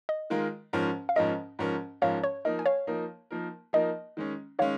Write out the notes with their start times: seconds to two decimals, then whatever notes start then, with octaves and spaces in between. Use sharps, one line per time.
0.09 D#5
0.30 D#3 G#3 F4 A#4
0.73 G#2 F3 C#4 A#4
1.09 F5
1.16 G#2 F3 C#4 A#4 D#5
1.59 G#2 F3 C#4 A#4
2.02 G#2 F3 C#4 A#4 C#5 F5
2.24 C#5
2.45 F3 A#3 D#4 A#4 D#5
2.59 G#5
2.66 C#5 F5
2.87 F3 A#3 D#4 A#4
3.31 F3 A#3 D#4 A#4
3.73 F3 A#3 D#4 A#4 D#5
4.17 D#3 G#3 C#4
4.59 D#3 G#3 C#4 C#5 F5